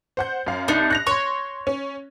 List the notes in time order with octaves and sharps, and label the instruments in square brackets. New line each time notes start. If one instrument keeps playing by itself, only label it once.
[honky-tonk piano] C5 F#5 G6
F#2 F5
[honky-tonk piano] C2 [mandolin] D4 D#4
[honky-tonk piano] F#6 A#6 F7
[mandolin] C#5 [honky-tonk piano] C6 C#6
[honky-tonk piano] C#4